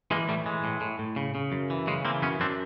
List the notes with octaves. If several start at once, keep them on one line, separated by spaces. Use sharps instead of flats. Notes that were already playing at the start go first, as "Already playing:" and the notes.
E3 G#3 A#3
A2 G3 A3
E3 G#3
A2
A2
A2
C#3
C#3
F#2
E3
C#3 G#3
E3 A#3 C4
F#2 B3 C#4
F#2 C4 D4